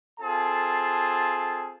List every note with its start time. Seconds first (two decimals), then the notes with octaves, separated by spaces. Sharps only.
0.20 C4 F4 G#4 A4 A5